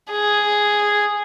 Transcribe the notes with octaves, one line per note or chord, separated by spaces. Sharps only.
G#4